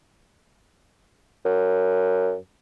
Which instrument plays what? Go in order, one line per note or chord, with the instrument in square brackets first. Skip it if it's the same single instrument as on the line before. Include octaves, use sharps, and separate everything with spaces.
[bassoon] F#2